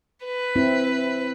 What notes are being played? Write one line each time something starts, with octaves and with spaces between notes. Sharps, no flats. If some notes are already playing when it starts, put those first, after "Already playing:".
B4
C4 E4